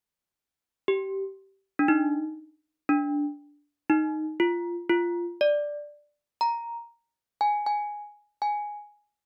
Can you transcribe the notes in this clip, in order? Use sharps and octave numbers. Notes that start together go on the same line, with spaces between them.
G4
D4
D#4
D4
D#4
F4
F4
D5
A#5
G#5
G#5
G#5